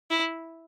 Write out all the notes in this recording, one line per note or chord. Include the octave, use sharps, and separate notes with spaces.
E4